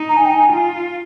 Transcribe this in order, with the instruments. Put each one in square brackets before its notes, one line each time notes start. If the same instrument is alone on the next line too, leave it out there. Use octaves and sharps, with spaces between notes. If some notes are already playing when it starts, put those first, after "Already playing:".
Already playing: [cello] D#4
[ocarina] A#5
G#5
G5
G#5
[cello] F4